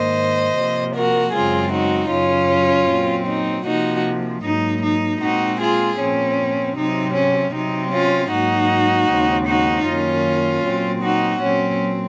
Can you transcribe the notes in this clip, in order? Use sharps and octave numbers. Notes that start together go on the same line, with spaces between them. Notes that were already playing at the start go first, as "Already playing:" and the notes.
Already playing: G#2 D#3 A#3 C5 D#5
C3 F3 A#3
F#4 A#4
F#2 C#3 G#3 C4 F4 G#4
D#4 F#4
F#2 C#3 F#3 C#4 F4
A#2 F#3 C4
D#4
C3 F3 A#3 D#4 F#4
G#2 F#3 A#3 D#4
D#4
A#2 G#3 C4 D#4 F#4
F4 G#4
A#2 F3 C4 C#4
C3 F#3 C4 D#4
C#4
C3 F#3 C4 D#4
C#4 F4
G#2 F#3 A#3 D#4 F#4
D#2 C#3 G#3 C4
D#4 F#4
F#2 D#3 A#3 C#4 F4
A#2 F#3 C4
D#4 F#4
A#2 F#3 C4 C#4